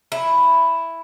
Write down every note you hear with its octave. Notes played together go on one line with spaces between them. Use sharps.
E4